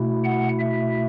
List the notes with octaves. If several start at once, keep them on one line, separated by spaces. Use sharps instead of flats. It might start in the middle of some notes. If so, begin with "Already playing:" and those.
Already playing: B2 A3 E4
F#5
E5